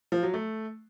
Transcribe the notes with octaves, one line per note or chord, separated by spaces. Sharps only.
F3
F#3
A3